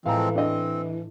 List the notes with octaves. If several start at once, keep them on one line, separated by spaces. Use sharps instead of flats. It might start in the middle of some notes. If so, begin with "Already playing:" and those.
A2 E3 F3 G#3 C4 F5 A#5
C4 D4 D#5